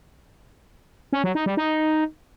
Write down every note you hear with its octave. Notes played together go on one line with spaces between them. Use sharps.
C#4
F#3
D#4
G3
D#4